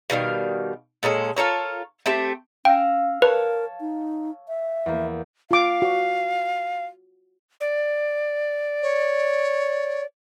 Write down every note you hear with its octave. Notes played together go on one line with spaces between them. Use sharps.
B2 D#3 G3 F5
A#2 G#3 C#4 A4
F4 A4 A#4 C#5
A3 C4 G4 E5
C#4 F5 G5 E6 A#6
A#4 B4 C#5 A5
D#4
E5
E2 A#3
F4 F5 D6
F#4
D5
C#5